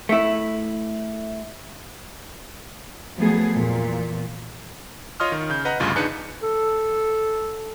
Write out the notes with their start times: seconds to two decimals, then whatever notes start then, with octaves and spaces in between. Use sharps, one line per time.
0.09 A3 E4
3.17 F3 F#3 A3 B3 G#4
3.55 E2 A#2
5.20 F4 C#5 D#5 C6 D#6 F6
5.32 D#3
5.50 C#3 G6
5.65 B4 D#5 F#5 A#5
5.80 G1 D2 G2 C#3 F4
5.95 E2 D4 D#4 G#4 B4 C#7
6.43 A4